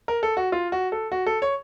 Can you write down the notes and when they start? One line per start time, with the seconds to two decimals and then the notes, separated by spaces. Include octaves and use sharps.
0.08 A#4
0.23 A4
0.37 F#4
0.52 F4
0.72 F#4
0.92 A4
1.12 F#4
1.26 A4
1.42 C#5